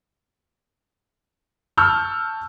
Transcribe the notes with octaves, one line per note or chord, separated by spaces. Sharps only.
A5 C#6 E6 F6 G6